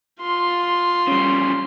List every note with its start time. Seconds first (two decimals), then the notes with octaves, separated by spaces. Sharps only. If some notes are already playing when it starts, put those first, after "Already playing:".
0.21 F4 C6
1.07 C#3 G3